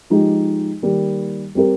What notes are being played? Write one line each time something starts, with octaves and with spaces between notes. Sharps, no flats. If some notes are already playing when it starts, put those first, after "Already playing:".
F3 G#3 D#4 G4
D#3 G3 A#3
G3 C4 G4 A#4